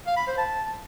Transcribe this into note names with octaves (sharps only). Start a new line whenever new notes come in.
F5
B5
C5
A5